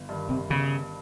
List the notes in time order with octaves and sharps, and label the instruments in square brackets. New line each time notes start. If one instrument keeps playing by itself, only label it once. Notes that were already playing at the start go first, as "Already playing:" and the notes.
Already playing: [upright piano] G1
G2 D#3
[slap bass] C3
[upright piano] G1 [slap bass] C#3